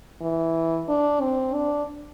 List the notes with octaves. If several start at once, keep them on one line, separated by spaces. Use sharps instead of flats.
E3
D4
C4
D4